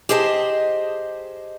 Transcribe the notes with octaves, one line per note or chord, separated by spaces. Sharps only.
G4 G#4 C5 D#5 F5 A5